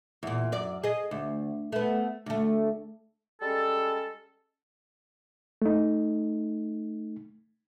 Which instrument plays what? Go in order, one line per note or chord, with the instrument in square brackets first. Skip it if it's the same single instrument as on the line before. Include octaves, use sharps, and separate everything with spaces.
[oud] E2 A#2
F#2 D5
G#4 D#5
D2
A3 B3
D2 A3
[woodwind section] G3 G#3 C#4 A4
[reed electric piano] A3 D#4